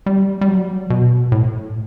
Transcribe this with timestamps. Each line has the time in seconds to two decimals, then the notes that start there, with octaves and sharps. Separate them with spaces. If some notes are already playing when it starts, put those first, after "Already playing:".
0.06 G3
0.41 G3
0.49 F#3
0.90 B2
1.32 A2